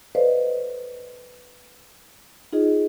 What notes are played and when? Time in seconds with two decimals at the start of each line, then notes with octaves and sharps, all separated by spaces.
0.15 A4 B4 C5 D5 D#5 F5
2.53 D#4 F4 G#4 D#5